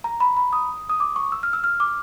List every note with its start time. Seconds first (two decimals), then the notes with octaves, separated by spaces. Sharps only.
0.04 A#5
0.20 B5
0.37 B5
0.53 D#6
0.90 D#6
1.00 D6
1.16 C#6
1.32 E6
1.43 F6
1.53 E6
1.64 F6
1.80 D6